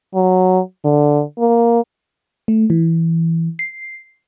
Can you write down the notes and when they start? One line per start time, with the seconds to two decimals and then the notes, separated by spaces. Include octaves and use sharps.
0.15 F#3
0.85 D3
1.39 A#3
2.48 A3
2.70 E3
3.59 C7